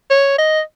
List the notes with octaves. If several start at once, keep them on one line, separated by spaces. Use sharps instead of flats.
C#5
D#5